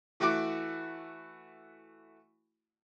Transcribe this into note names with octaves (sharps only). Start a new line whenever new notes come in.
E3 A3 E4 F#4 F#5 D6